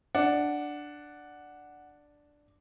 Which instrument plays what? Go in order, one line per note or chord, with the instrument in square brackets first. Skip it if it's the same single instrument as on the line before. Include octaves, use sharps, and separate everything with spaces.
[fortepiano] D4 [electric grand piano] F#5